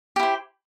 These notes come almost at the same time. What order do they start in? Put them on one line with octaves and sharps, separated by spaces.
G4 E4 C5